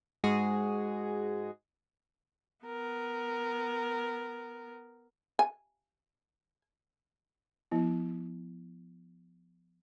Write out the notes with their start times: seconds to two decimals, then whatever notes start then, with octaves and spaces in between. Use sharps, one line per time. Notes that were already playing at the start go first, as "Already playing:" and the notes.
0.24 G#2 G#3 F#4 G#4
2.65 B3 A#4
5.39 G#5
7.72 F3 B3 E4